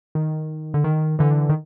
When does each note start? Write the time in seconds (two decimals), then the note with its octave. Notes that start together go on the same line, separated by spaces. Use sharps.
0.15 D#3
0.74 D3
0.84 D#3
1.19 D3 E3
1.49 D#3